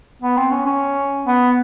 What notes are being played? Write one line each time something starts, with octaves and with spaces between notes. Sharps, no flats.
B3
C4
C#4
C#4
B3